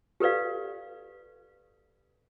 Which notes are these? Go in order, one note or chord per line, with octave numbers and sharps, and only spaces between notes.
G4 A4 B4 D5 F5